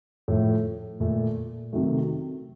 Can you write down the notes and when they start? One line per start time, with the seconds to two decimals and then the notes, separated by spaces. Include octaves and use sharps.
0.28 A2 F3 A3
1.00 A#2 A3
1.73 C3 D#3 F#3 A3